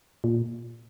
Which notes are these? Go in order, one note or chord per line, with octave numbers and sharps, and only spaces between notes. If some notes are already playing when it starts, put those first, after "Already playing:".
A#2